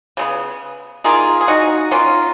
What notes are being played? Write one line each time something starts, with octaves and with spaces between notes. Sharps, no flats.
C#3 G#3 B3
D#3 A#3 F4 G#4
G#4
D#4 F#4
D#3 A#3 C#4 F4